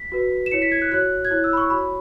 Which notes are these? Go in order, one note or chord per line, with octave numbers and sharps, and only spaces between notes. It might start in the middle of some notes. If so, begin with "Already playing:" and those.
Already playing: B6
F#4 B4
E7
E4 C#5 C#7
B6
G#6
F#6
F#4 C#5 F#6
G#6
E4 C#5 F#6
E6
B5
C#6
F#4 C#5 B5